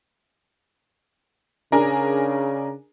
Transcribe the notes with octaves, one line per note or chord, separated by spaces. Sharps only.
C#3 D4 G#4 A#4